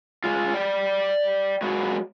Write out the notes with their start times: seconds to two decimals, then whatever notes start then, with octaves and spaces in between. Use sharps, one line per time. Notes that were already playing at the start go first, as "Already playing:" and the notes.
0.24 G#3 F4
0.54 D5 G5
1.62 F#3 G#3 A#3 F#4